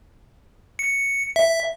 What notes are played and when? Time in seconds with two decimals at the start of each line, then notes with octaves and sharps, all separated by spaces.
0.79 C#7
1.36 E5